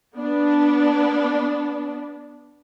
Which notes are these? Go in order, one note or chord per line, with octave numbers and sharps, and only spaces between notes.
B3 D4